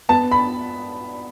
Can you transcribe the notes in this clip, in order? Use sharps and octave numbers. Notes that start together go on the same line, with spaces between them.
B3 A5
B5